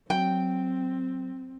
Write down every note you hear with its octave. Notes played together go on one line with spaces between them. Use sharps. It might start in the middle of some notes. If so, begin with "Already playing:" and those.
F#3 C4 G5